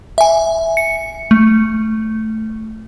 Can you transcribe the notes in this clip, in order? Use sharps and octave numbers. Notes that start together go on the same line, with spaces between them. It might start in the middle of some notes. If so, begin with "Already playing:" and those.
E5 G#5
C#7
A3